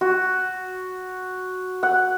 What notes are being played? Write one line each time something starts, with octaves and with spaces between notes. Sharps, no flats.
F#4
F#5